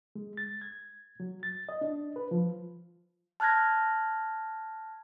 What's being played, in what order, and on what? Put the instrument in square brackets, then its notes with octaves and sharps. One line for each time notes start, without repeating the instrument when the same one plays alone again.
[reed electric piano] G#3
A6
G#6
F#3
A6
D#5
D4
B4
F3
[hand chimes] A5 F6 F#6 G#6 A#6